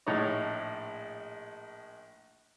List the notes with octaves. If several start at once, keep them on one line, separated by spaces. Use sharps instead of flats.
A#1 A2 D#4 C#5 D#5